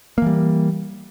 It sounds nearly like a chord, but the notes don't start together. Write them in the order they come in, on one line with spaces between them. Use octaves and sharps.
A#3 E3 G3